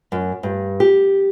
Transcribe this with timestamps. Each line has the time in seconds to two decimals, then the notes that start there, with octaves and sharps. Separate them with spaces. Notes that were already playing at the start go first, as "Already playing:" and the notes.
0.12 F#2
0.43 G2
0.80 G4